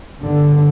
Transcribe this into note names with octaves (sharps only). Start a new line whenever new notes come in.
G1 G2 D3